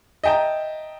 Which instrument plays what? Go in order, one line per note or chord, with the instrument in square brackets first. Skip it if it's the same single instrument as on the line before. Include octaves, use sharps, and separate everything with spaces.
[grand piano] D#5 E5 G5 A5 A#5